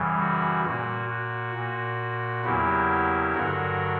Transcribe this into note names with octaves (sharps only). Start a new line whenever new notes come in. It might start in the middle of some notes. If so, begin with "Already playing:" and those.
Already playing: F#2 C#3 E3 G3
F#4
A#2 A#3 F#4
F#4
A#2 A#3
E2 C#3 F#3 A#3 E4 G4
G2 D3 F#3 F#4 A#4